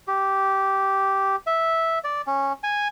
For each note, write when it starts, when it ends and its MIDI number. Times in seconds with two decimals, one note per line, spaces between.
0.08 1.36 67
1.47 1.99 76
2.04 2.22 74
2.27 2.53 61
2.64 2.88 80